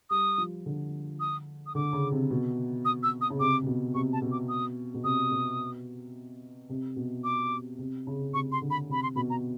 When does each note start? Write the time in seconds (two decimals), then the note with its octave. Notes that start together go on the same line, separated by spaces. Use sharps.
0.10 G3 D#6
0.38 F3
0.66 D3
1.20 D#6
1.66 D#6
1.75 D3 D6
1.93 C#3
2.12 C3
2.31 B2
2.85 D#6
3.03 E6
3.21 D#6
3.30 C#3
3.40 C3 D6
3.63 C3
3.67 B2
3.95 C3 C#6
4.13 A5
4.22 B2
4.32 D6
4.49 D#6
4.94 B2
5.04 C3 D#6
5.31 B2
6.69 C3
6.96 B2
7.24 D6
7.79 C3
8.07 C#3
8.33 C3 C#6
8.52 C6
8.61 D3
8.70 B5
8.89 C3 B5
9.03 C6
9.16 B2 B5
9.30 A#5